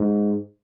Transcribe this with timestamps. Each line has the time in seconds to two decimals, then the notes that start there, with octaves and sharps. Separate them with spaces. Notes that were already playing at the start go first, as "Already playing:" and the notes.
Already playing: G#2